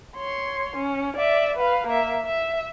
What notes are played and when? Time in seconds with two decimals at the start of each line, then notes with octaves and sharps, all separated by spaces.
0.17 C#5 C6
0.76 C#4
1.17 D5 E5
1.57 B4 F5
1.87 A#3 E5
2.26 E5